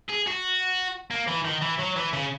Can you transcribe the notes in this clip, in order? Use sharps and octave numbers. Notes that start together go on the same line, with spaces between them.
G#4
F#4
A#3
E3
D#3
E3
F#3
E3
C#3